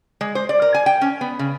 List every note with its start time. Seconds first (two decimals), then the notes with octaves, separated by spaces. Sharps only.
0.21 G#3
0.35 C5
0.49 D5
0.62 A#4
0.74 G#5
0.86 G5
1.01 C#4
1.21 B3
1.39 C#3